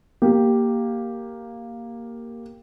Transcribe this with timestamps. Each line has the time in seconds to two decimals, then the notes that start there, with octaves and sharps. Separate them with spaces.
0.22 A#3 G4